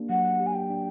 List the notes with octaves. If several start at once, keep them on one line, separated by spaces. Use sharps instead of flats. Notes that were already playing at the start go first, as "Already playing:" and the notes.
Already playing: A#3 D4 G4
F#3 F#5
G4
G#5
G5
D4